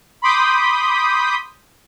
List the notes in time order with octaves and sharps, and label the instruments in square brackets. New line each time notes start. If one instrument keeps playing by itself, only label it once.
[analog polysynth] B5 C6 D6 D#6 G6 B6